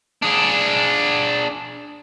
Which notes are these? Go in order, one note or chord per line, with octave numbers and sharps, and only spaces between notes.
D4 G#4